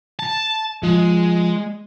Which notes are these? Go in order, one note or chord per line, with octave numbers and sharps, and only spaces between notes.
A5
F3 G#3